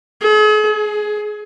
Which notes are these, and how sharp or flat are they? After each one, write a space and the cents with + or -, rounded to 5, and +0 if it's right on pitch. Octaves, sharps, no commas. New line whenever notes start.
G#4 +45
G#4 +20